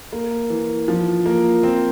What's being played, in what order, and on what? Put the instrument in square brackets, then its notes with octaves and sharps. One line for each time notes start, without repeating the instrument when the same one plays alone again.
[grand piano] A#3
E3
F3
A#3
C4